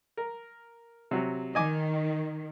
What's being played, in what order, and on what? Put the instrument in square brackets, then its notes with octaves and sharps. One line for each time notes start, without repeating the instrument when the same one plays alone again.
[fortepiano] A#4
C3 F#3
[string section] D#3 [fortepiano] D#5 G#5 D6